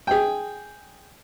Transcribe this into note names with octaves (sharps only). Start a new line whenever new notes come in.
G#4 G5